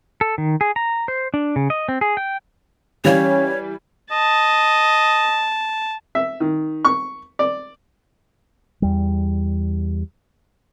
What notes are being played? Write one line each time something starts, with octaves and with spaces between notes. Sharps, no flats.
A4
D#3
G#4
A#5
C5
D4
C#3
D#5
C4
G#4
G5
E3 G3 C#4 G4 C#5 F5
D#5 A5
E5
D#3
C#6
D5
E2 G3